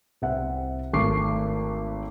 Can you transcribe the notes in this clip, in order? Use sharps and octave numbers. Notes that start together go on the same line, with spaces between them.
C2 C4 E5 F#5
G#1 A3 C#6 D6 C7